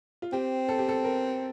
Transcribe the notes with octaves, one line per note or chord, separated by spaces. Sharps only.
F4
C4 G4
A4
G4
A4
A#4